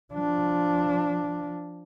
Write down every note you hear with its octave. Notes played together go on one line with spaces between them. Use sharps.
F3 D4